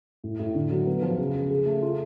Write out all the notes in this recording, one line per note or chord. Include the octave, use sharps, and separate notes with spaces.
A2
A2
D3
F#3
B3
F3
C#3
C#3
G#4
A3
F4